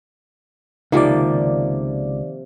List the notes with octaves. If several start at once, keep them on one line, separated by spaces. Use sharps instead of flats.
C#2 C3 D#3 F3 A#3 D5